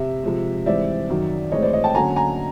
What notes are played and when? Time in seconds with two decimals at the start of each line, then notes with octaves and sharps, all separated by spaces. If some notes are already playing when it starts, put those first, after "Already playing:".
Already playing: C3 E5
0.23 C3 F3 G#3
0.66 G#2 E3 G3 C4 D5 E5
1.09 F#2 D#3 F#3
1.52 A2 E3 G#3 C4 C#5 D#5
1.62 C5 D5
1.73 C#5 D#5
1.84 G5 A5
1.95 D3 F#3 A#3 C#4 G#5 A#5
2.16 G#5 A#5